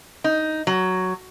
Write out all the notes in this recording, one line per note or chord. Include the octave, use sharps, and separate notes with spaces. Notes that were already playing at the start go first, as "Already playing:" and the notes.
D#4
F#3